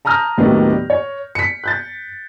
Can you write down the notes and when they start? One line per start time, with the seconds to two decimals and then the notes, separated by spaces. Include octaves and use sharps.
0.05 A5 A#5 D#6 F6 G6 A#6
0.37 D#2 A2 D#3 F#3 B3 D4
0.90 C#5
1.35 B6 C#7
1.64 F#6 G6 A6